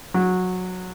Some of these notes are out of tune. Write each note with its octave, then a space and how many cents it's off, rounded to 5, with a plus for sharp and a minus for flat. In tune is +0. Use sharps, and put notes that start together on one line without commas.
F#3 -15